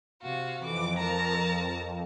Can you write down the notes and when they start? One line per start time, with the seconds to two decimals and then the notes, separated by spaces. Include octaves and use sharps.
0.22 C3 F#4 F5
0.62 F2 E3 D6
0.97 A#4 A5 A#5